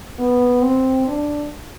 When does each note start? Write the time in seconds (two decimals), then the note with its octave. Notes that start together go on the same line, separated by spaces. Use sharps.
0.19 B3
0.62 C4
1.08 D4